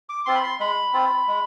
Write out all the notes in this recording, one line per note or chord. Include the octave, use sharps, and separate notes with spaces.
D6
C4 F4 C6
B5
C6
G#3 B5
C4 F4
G#3